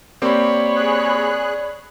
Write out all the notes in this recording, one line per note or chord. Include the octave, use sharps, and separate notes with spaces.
A#3 C4 G4 C#5 D5 B5
G#4 F#6